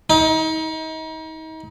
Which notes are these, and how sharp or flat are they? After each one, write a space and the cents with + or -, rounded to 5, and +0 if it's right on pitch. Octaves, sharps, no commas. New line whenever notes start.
D#4 +35